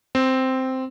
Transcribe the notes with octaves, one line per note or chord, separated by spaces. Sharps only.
C4